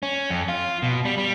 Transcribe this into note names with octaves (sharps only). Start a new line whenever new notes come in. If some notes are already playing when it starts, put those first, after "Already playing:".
C#4
F2
F4
B2
G3
G3